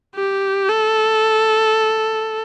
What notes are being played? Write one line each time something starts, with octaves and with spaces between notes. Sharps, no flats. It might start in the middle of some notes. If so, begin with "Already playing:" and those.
G4
A4